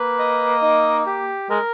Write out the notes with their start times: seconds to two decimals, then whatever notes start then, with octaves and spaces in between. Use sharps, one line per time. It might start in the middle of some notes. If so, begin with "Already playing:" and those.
Already playing: A#3 B4
0.19 D#5
0.62 D#4
1.06 G4
1.50 G#3 A#4